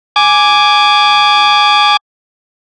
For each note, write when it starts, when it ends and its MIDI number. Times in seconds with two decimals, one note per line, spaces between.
0.16 1.97 80
0.16 1.97 86